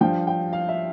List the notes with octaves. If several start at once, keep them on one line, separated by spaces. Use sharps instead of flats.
G2 F3 G5
G5
F5
E5